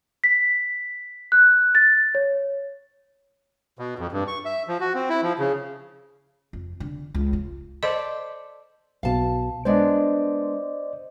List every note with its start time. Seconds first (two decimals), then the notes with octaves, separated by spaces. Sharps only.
0.24 B6
1.32 F#6
1.75 A6
2.15 C#5
3.79 B2
3.99 F2
4.12 G2
4.28 C#6
4.45 E5
4.68 F3
4.81 F#4
4.95 C4
5.09 E4
5.23 F3
5.39 C#3
6.53 F2
6.80 D3
7.15 C#2
7.33 F4
7.83 A4 C5 D5 D#5
9.03 B1 B2 F5 A5
9.65 G#3 B3 D4 C5 D5 D#5